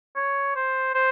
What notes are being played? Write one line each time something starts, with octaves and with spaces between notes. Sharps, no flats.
C#5
C5
C5